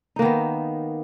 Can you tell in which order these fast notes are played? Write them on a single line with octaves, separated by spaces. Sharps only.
D#4 A#3 D#3 B3